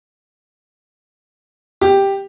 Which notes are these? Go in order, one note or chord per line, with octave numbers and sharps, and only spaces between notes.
G4